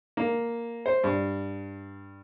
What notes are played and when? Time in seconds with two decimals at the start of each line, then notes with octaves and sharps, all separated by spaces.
0.17 A#3
0.86 C5
1.04 G2